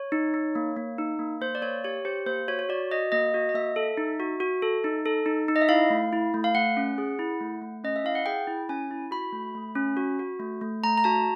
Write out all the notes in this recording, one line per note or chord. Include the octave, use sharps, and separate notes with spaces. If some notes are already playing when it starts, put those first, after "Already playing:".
Already playing: C#5
D#4
D#4
A#3
A#3
D#4
A#3
A#3 C5
D5
A#3 C#5
G4 C#5
G4 C5
A#3 C5
F#4 C#5
C#5
F#4 D5
F#4 D#5
A#3 D#5
F#4
D#5
A#3 E5
A4
D#4
F#4
F#4
A4
D#4
A4
D#4
D#4
D#5
E5
E4 F5
A3
E4
A3
F5
A3 F#5
C#4
G#4
E4
A3
A3
C#4 D#5
E5
E4 F5
F#5
G#4 G5
E4
C#4 G#5
E4
F#4 B5
A3
A3
C#4
F#4
F#4
A3
A3
A3 A#5
A#5
F#4 A5